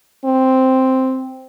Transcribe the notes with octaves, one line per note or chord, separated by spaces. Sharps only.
C4